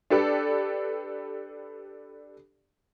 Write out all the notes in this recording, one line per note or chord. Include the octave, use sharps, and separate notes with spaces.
D4 G4 A4 B4 D5